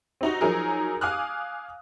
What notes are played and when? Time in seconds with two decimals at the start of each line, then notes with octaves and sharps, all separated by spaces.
0.21 C4 D#4 F#4
0.41 F3 F#3 D#4 G#4 A#4
1.01 F5 G#5 D6 D#6 F6 F#6